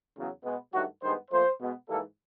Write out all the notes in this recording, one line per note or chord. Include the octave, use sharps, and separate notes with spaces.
E2 C#3 F#3
B2 G#3 B3
G2 D#3 F#3 A3 F#4
G2 D#3 G#3 B3 C5
A#2 F3 A3 C5
B2 G#3 B3
G#2 E3 G3 A#3 A4